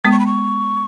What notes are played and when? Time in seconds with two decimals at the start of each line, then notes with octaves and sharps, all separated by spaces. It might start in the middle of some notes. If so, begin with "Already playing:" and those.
0.05 G#3 B3 D#6
0.12 C#6
0.20 B5
0.27 C#6